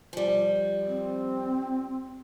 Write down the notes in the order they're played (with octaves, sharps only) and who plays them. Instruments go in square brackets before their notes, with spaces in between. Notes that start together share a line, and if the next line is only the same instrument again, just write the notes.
[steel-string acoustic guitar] F3 G3
[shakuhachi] C4